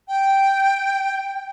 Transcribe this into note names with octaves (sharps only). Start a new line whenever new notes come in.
G5